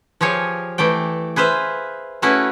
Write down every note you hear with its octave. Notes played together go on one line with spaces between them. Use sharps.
F3 G4 G#4 C#5 F5
E3 A3 D5 G5
G#4 B4 C5 E5 F5
A3 C#4 E4 F#4 G#4 B4